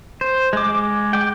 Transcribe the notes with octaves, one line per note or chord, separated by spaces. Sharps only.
C5
G#3 D6
G5 D6